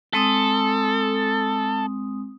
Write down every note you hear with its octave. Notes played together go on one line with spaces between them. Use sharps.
G#3 C4 A4 D#6